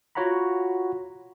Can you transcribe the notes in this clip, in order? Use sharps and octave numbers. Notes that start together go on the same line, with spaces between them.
F4 F#4 C#5 F#5 A#5 B5